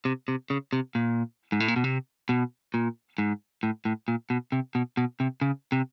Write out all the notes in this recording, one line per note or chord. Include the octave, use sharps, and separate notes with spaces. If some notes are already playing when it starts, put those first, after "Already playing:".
C3
C3
C#3
C3
A#2
G#2
A2
A#2
B2
C3
B2
A#2
G#2
A2
A2
A#2
B2
C3
B2
B2
C3
C#3
C3